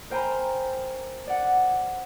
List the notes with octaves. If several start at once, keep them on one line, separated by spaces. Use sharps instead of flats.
A#4 C5 G5 G#5 A#5 B5
D5 F#5